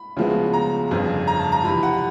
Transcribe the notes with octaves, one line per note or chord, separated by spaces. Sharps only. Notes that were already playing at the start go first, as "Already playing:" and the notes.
Already playing: B5
D2 C#3 F3 G#3 B3
A#5
G1 F2 C#3 F3
A#5
A5
A#5
F2 C3 E3 B5
F#5